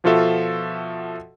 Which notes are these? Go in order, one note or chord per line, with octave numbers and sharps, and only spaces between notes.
B2 F3 F4 F#4 A4 E5